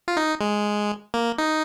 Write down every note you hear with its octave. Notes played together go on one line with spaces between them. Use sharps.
F4
D#4
G#3
A#3
D#4